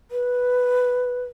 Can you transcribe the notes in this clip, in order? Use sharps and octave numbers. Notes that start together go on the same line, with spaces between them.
B4